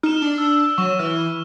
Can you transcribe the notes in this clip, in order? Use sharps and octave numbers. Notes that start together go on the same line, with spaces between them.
D#4 F6 E7
D4
E6
F#3 C#6 E7
E3 F6